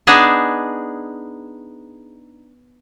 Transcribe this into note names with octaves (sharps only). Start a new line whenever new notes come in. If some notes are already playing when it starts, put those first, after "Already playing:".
B3 D4 D#4 G#4 A5